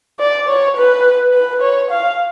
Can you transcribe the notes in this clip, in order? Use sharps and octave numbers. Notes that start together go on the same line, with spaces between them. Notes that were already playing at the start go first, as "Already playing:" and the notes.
D5
C#5
B4
B4
C#5
F5